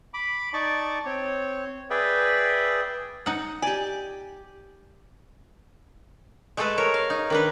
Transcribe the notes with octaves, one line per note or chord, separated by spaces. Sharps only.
B5 D6
D#4 D5 A5 C#6 D6
C4 C#5
G#4 B4 D5 E5 G5
D#4 F#5
G4 D5 G#5
G#3 A3 G#4 A4 B4
A#4 C#5
F5
D#4
D#3 D4 B4